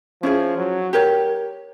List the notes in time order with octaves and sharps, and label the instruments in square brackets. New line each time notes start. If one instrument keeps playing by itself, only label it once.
[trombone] F3 [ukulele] C#4 E4 G#4
[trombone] F#3
[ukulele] G4 A#4 C#5